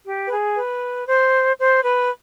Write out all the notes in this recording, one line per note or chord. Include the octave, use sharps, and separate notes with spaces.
G4
B4
G#4
B4
C5
C5
B4